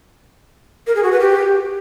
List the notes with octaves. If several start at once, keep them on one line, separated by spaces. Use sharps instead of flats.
A#4
G#4
F#4
B4
G4